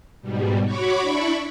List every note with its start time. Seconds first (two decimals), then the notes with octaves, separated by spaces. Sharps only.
0.22 G#2 B2 G3
0.64 F#4 C#5 B5 C#6 D6
1.01 D4 E4 D5 B5 C#6